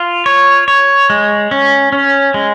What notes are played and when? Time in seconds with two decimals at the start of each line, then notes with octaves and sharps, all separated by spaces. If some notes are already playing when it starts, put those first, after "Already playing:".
Already playing: F4
0.26 C#5
0.68 C#5
1.10 G#3
1.51 C#4
1.92 C#4
2.34 G#3